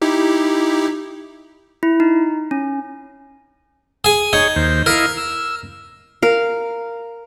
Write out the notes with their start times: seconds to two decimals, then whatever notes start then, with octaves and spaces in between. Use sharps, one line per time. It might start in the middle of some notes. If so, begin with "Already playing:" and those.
0.02 D#4 E4 G4
1.83 E4
2.00 D#4
2.51 C#4
4.05 G#4 G#5
4.33 D#4 G#4 C#5
4.56 D#2 C5
4.86 E4 A#4 D#5 F5
5.17 E6
6.23 A#4 F5